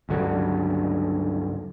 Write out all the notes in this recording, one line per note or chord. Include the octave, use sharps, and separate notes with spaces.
C#2 G2 D3 F#3